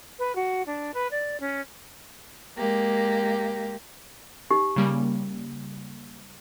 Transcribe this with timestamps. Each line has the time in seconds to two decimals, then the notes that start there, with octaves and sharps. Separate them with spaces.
0.19 B4
0.35 F#4
0.66 D4
0.94 B4
1.11 D5
1.40 C#4
2.57 G#3 A#3 G4
4.51 D#4 G4
4.76 C#3 G3 A#3